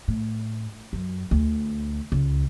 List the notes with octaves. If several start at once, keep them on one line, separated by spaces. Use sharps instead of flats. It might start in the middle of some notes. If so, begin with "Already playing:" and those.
A2
F#2
D2
C#2